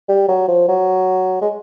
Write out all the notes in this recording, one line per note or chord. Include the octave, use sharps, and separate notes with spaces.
G3
F#3
F3
F#3
G#3